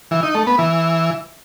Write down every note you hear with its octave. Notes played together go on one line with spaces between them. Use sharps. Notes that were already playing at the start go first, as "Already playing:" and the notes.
E3
D#4
A3
B3
E3